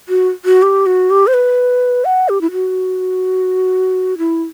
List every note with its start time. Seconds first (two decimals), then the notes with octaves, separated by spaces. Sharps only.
0.09 F#4
0.45 F#4
0.62 G4
0.86 F#4
1.10 G4
1.27 C5
1.34 B4
2.05 F#5
2.29 G4
2.41 E4
2.52 F#4
4.18 E4